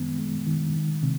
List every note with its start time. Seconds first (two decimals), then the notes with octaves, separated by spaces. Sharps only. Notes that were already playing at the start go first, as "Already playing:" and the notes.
Already playing: F#2 D#3 G#3 B3
0.19 G#3
0.46 D#3
0.75 D#3
1.03 C3